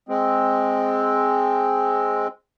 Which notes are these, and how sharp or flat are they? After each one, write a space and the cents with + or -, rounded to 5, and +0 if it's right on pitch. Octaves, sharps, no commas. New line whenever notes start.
G#3 +0 C4 +0